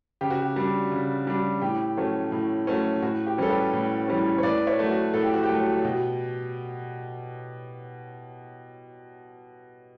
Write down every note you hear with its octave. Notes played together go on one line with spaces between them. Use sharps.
C#3 G4
F#4
G4
G3 D4
C#3
G3 D4
A2 G4
F#3 A3 C#4
A2
F#3 A3 C#4
A2 F#4
G4
E3 G3 C#4 A4
G4 B4
A2
E3 G3 C#4
C#5
A2 B4 D5
C#5 E5
F#3 A3
F#4
A2 A4
G4
F#4
G4
F#3 A3
B2